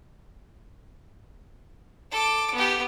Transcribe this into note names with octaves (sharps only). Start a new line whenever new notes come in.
A4 D6
B3 G4